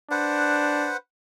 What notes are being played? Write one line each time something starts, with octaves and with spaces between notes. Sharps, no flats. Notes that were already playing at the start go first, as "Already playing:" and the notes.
D4 B4 C5 F#5